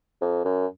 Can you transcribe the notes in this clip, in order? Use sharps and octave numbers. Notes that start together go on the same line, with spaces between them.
F2
F#2